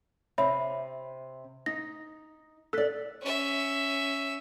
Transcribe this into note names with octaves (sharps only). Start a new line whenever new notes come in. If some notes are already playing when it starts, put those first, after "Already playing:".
C3 C4 C#5 E5 B5
D#4 A#6
A4 D5 E6 F#6 B6
C#4 E5